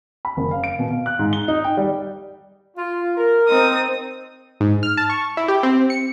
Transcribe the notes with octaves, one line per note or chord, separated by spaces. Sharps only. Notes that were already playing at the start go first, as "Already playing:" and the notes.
B5
F#1
F5
D7
B2
F5
F#6
G#2
G7
D#4
G5
G3
F4
A#4
C4 D#4 D#6
G#2
F6
A5
C#6
E4
G4
C4
C#7